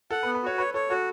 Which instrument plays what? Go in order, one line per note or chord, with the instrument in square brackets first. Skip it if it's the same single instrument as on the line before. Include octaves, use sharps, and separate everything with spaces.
[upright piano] A4 [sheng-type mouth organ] F#5
[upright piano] B4
[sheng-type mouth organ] B3
[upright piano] B4
[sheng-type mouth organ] F#4 [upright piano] C#5
[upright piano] B4 [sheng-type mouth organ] C#5
[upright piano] A4 [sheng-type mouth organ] C#5
[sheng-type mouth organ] F#4 [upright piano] A4